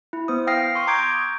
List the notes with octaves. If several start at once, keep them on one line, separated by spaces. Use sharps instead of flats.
E4
B3 C5 D#6
F5 G5 D#6 F6 A#6 C7
C6 C#6 D#6
A#5 C#6 D6 G6 G#6 D7
G6